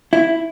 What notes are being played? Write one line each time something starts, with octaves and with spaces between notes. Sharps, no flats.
E4